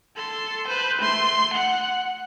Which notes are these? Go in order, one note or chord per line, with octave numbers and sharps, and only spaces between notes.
A4 C6
B4 C5
A3 C6
F#5